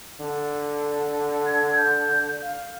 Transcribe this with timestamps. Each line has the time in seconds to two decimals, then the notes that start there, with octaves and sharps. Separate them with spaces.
0.21 D3
1.46 G#6
1.76 G6
2.42 F5